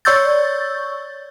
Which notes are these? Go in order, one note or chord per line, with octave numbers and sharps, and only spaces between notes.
C#5 D5 C#6 E6 G6 A6